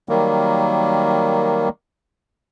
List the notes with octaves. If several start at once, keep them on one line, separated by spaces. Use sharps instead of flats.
D#3 F#3 G3 A#3